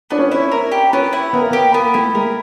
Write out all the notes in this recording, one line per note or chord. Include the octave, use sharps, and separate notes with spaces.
B3 D4
C#4
C4
C#4 E4
A#4
G4
B3 C#4
E4
B3 A#4
A#3
B3
G4
A#3 B3
A3 E4
G#3 A#4